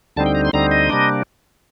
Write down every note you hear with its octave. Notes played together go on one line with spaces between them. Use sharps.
D2 D3 G3 C4 D#4 A5
G5
A#5
C6
D2 D3 G3 C4 D#4 A#5
D#5
C3 G3 A#3 D4